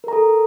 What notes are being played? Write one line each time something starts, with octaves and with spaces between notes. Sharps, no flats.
A4 A#4 A#5